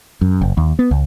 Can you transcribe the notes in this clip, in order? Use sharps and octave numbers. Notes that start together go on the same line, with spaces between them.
F#2
F#1
D#2
B3
C#2